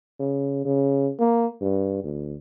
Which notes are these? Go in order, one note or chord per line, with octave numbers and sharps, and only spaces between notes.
C#3
C#3
A#3
G2
D2